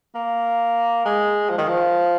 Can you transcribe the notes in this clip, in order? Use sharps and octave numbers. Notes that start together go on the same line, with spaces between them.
A#3
G#3
F3
D#3
F3